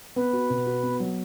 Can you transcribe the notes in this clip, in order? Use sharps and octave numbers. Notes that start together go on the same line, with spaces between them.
B3 B4
F#4
B2
F#4
B3
F#3